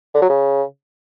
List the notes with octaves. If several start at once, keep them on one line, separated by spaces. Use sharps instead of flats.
D3
F#3
C#3